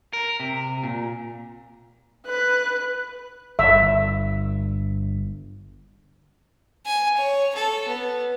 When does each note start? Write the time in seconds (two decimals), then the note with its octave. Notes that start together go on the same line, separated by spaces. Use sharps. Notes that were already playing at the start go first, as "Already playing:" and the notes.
0.13 A#4
0.40 C3
0.84 A#2
2.27 B4 F#6
3.59 G1 E5
6.86 G#5
7.17 C#5
7.55 A4
7.88 B3